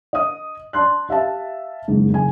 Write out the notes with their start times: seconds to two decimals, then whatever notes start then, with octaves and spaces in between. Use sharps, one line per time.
0.13 D#5 D#6
0.73 D5 A5 C6 F#6
1.09 G4 E5 F5 A5
1.88 F#1 G#2
2.10 F#1 G#5